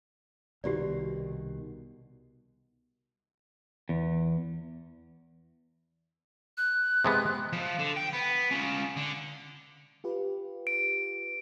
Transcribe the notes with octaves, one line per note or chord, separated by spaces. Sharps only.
C2 B2 D#3 F#4 G4 D5
E2
F#6
C3 G#3 B3
F3
D3
G5
B3
C#4 F4
D3
F4 G4 B4
D7